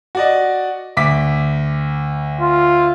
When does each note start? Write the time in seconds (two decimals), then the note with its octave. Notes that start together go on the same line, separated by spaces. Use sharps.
0.15 F#4 D5 D#5
0.97 D2 D6 B6
2.41 F4